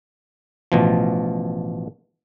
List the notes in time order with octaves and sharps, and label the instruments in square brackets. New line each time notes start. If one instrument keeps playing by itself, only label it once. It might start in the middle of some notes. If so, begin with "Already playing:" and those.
[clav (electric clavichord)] A1 B2 F3